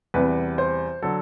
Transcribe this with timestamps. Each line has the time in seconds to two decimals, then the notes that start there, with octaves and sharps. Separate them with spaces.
0.14 E2 C3 G3 B4
0.58 C5
1.02 D3 F#3 A4